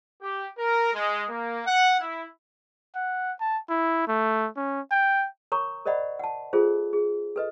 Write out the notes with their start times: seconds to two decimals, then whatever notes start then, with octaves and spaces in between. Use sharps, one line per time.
0.22 G4
0.57 A#4
0.94 G#3
1.27 A#3
1.65 F#5
2.00 E4
2.95 F#5
3.41 A5
3.69 E4
4.08 A3
4.57 C#4
4.91 G5
5.52 A#4 C#5 A#5 C#6
5.86 A#4 C5 D5 D#5 F#5 B5
6.20 F#5 A5
6.53 F4 G#4 A4 C5
6.93 G#4
7.36 A4 B4 D#5